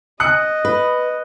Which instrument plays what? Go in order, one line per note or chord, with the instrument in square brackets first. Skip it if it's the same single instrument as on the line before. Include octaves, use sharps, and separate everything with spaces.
[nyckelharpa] D#5 [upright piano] D#6 F#6 C#7
[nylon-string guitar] B4